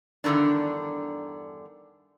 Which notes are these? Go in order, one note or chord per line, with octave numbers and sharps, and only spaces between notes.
E2 G2 D3 D#3 D4